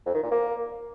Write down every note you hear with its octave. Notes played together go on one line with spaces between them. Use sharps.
F2
D#3
A#2
A#3